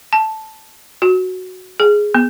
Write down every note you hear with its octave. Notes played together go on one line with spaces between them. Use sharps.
A5
F#4
G#4
B3